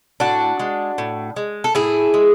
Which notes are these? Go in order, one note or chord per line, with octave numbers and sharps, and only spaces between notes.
A2 D4 F#4
G#3
A2
G#3
A4
A2 E4 G#4
G#3